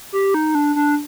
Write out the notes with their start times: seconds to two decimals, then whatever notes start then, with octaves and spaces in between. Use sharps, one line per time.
0.12 G4
0.34 D#4
0.55 D4
0.76 D4